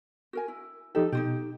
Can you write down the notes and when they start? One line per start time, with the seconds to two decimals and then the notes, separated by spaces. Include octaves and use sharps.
0.33 F#4 A#4 G#5
0.48 E4
0.95 F3 D#4 G4 A4
1.12 B2 D#4 F4 G4